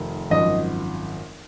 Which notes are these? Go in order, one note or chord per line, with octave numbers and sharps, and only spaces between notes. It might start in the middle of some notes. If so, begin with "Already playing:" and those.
Already playing: F1 D#3
G#1 F#2 F3 D#5